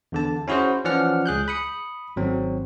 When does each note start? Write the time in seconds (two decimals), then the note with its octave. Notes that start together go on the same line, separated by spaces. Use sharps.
0.12 E2 D3 A5
0.48 C#4 E4 F#4 G#4 C5
0.85 E3 F3 C#4 D5 F#5 F6
1.26 C#2 G#4 F#6 G6
1.48 B5 D#6 C#7
2.16 G#1 F#3 C4